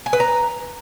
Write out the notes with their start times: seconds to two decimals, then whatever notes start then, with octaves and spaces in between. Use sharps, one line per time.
0.06 G#5
0.13 B4
0.20 A#5